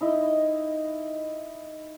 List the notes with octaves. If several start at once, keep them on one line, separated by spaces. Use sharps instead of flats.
D#4 E4 D#5